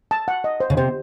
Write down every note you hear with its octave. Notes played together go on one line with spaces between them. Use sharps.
A5
F#5
D#5
C5
C#3
C3 C5